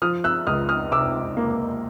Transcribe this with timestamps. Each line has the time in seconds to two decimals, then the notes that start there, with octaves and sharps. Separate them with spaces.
0.02 F3 D#6 F6
0.24 E6 F#6
0.47 C#2 D#6 F6
0.69 D#6 F6
0.92 C3 D6 E6
1.37 A#3